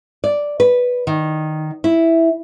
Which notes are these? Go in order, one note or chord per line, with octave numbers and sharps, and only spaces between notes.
D5
B4
D#3
E4